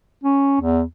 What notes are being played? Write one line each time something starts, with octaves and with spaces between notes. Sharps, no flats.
C#4
E2